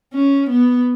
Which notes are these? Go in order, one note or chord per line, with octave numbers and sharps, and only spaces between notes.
C#4
B3